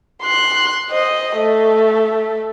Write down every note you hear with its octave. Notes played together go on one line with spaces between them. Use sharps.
C6 F#6
C5 D#5
A3